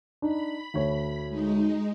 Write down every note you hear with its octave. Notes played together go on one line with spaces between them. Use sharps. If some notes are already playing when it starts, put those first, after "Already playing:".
D4 D#4 B5
D2 C#5
G#3 D#4